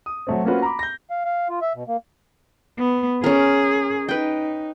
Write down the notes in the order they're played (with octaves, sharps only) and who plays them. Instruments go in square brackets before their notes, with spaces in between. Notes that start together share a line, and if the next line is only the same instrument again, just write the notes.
[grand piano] D#6
F#3 A3 C4
A#3 C4 C#4 F4 F#4 B4
A#5 B5 D6
G6 A#6
[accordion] F5
F5
F4
E5
B2
A#3
[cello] B3
[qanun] C#4 A#4 [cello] G#4
[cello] D#4 [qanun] B4 G5